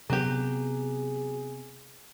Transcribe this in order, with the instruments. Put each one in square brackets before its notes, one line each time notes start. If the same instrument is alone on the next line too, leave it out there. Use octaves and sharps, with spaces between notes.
[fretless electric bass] C3 B3 [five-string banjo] F#3 G4 [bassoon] G#4